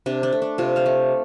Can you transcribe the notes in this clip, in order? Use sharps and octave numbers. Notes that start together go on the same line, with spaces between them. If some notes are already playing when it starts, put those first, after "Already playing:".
C3 D4
D4
A3
D4
C3 C4 F4
C5 F5
A3